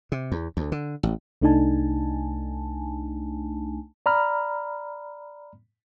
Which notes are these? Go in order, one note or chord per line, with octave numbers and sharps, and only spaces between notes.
C3
E2
D2
D3
A1
C2 A3 D4 D#4 G#5 A5
D5 A#5 B5 F6